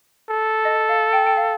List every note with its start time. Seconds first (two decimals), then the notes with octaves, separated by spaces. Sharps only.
0.30 A4
0.65 D#5
0.89 F5
1.13 G5
1.27 G5
1.37 F5